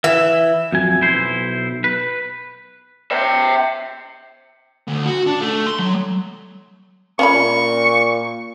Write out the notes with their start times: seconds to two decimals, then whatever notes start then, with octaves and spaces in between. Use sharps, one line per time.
0.04 E3 E5
0.72 F2 F#3 G#5
1.01 B1 E4 C5
1.84 B4
3.11 E5 G5
4.87 D2
5.05 F#4
5.26 D4
5.41 A3
5.66 C6
5.79 F#3
7.19 A#2 C#4 D4 B5 C#6